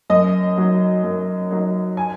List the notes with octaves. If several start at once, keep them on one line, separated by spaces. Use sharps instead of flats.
F#2 D#5
F#3 D#4
F#2
F#3 D#4
G#5